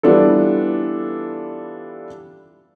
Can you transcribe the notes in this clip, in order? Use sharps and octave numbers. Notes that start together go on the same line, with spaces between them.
E3 G3 B3 D4 F4 A4